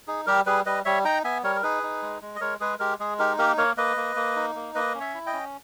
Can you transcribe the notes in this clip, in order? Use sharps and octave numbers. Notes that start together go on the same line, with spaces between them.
D#4 G#4
G3 G4 A#4
G3 G#4 B4
G3 B4 D#5
G3 C#5 E5
D#4 G5 A#5
B3 E5 G#5
G3 A#4 C#5
A#4
D#4 G#4 B4
D#4
G#3
G#3
D#5
G#3 A#4 C#5
G#3 G#4 B4
G#3 G4 A#4
G#3 G#4
D#4 G4 A#4
A#3 G4 A#4
A#3 A#4 C#5
A#3 B4 D#5
A#3
A#3
D#4
A#3
A#3 B4 D#5
C#4
C#5 E5
E4
D#5 G5
C#4